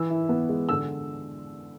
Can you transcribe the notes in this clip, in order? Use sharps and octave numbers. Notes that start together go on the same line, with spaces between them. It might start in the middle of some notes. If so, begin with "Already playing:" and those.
Already playing: E3 E6
E4
B3
G#3
D3 E6